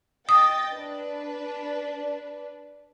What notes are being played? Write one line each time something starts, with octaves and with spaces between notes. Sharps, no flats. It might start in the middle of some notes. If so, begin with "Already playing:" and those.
D#5 G5 D#6 A6
D4 B4